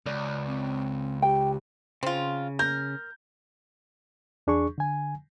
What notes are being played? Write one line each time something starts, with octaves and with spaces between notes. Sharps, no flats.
C#2 D5
C4
G4 G5
C#3 C4 F4
A#4 G6
E2 D4 G#4 C#6
D3 G#5